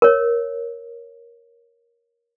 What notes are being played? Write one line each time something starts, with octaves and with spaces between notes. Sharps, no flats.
A#4 C#5